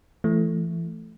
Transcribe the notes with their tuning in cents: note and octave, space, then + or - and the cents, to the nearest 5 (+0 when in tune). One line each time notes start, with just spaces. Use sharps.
E3 +35 A3 +0